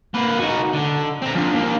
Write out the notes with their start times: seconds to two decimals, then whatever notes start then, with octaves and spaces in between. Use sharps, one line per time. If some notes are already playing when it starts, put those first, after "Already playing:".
0.14 A#3 B4
0.38 D#4 F#4
0.73 D3
1.22 C4 A#5
1.35 F3 D4
1.53 D#2 A#3